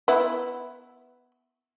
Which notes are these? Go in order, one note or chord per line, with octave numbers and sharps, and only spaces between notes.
B3 E4